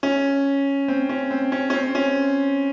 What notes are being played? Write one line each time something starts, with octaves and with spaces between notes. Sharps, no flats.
C#4
C4
C#4
C4
C#4
C#4
C4
C#4